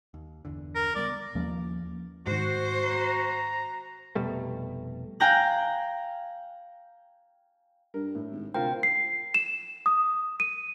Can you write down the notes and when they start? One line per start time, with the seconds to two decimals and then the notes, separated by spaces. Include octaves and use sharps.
0.14 D#2
0.45 G1 E2 D3
0.75 A#4
0.95 C#2 G3 B3 D5
1.35 D#2 F3 A#3 C#4
2.27 G#2 D#3 F#4 C5
2.83 A#5
4.15 F1 B2 G3 A3
5.20 F5 G5 G#5 A#5 F#6
7.94 G2 A#4
8.15 A2
8.31 G#1
8.54 D2 C3 F4 A#4 C5 G5
8.83 C7
9.34 E7
9.86 D#6
10.40 D#7